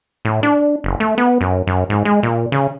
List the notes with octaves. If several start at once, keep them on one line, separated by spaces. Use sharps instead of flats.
A2
D4
F#1
A3
B3
F#2
F#2
G#2
G#3
A#2
C#3